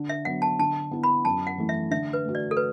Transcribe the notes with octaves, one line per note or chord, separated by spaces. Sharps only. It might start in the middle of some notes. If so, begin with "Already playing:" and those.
Already playing: D3
E5
F#3 B3 D4 F#5
A5
D3 A5
B3 E4
B5
F#2 A5
F#5
E3 A3
E5
D3 E5
B4
A3 F#4
D5
A4
B4